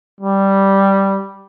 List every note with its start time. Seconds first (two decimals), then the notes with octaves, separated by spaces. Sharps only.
0.21 G3